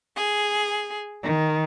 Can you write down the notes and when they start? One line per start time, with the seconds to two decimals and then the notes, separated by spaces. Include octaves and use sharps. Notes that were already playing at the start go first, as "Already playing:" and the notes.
0.17 G#4
1.24 D#3